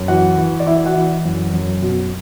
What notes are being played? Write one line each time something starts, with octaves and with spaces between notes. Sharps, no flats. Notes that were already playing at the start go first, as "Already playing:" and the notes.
Already playing: F#2
E3 F#4 F#5
E3
D5
E3 E4 E5
F#4 F#5
E3
F#2
F#2
B2